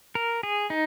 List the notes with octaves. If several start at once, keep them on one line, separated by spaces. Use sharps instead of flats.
A#4
G#4
D#4